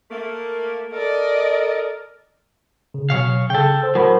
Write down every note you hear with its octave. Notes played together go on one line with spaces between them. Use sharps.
A3 A#3
A4 A#4 D5 D#5
C#3
B2 F#3 C#5 F5
C#3 A4 G5
C5 E6
A2 F#3 A#4 C5 B5